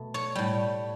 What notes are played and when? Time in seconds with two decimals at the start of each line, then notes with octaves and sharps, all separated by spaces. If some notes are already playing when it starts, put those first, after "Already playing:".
Already playing: B2 A3
0.14 C#5
0.35 A2 G3